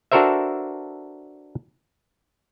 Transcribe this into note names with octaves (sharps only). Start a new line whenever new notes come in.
D4 F#4 A4 A#4 C5 E5